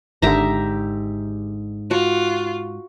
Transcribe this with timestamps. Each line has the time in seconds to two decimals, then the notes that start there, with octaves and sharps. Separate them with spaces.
0.22 G#1 G#2 D3 G4 E5 A#5
1.91 F4 F#4